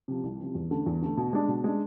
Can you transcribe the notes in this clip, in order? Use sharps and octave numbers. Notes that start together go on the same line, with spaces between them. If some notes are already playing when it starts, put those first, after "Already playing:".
C3 F3
C2
C3 F3
E2
D3 A3
E2
D3 A3
B2
G#3 D4
B2
G#3 D4